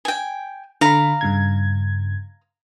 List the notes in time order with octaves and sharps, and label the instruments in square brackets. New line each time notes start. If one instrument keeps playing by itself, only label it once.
[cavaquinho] G5 G#5
[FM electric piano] D3 B5 [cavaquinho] F5 A#5
[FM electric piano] G2 C#3 G#6